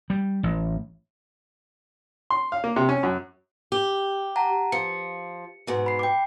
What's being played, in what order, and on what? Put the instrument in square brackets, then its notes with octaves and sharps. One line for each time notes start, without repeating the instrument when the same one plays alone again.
[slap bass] G3
A1
[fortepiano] C6
F5
A#3
C3
C#4
F#2
[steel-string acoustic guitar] G4
[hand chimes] F#5 A5 A#5
[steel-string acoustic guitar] F3 [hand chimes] C#7
[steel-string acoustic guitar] G#2 B2
[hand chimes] B5 C7
G5 D6